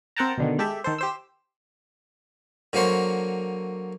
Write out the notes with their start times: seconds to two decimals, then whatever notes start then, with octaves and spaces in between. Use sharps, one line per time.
0.16 C4 A#4 F#5 G5 A5 A#5
0.38 B2 D3 D#3
0.58 G#3 G4 A4 E5
0.84 D#3 A4 C5
0.98 G4 C5 E6
2.73 D3 F#3 A#3 C5 C#5